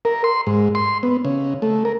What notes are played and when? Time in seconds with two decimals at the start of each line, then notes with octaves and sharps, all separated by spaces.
0.05 A#4
0.24 C6
0.47 G#2
0.75 C6
1.03 B3
1.25 C#3
1.62 A3
1.85 A#4